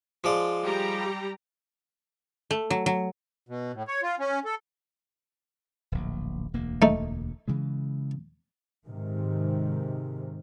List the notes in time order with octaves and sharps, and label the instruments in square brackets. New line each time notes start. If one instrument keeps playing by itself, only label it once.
[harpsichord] F3 G#3 D5
[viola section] G3 G4 A#5
[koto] A3
F#3
F#3
[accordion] B2
A2
C#5
F4
C#4
A4
[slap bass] D1 A#1
E1 D2 A#3
[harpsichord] A3 D#4
[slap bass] C#3 E3 G#3
[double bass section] G#2 C3 D#3